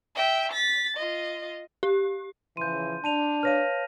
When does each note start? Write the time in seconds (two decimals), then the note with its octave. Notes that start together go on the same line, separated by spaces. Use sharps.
0.15 E5 G5
0.52 A6 B6
0.97 F4 D#5
1.83 G4
2.57 C#3 E3 F3 C6 G6 D#7
3.04 D4 A5 D#7 F7
3.43 B4 C#5 F5 F6 A#6 D#7